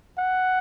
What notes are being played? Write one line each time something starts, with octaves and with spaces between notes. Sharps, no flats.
F#5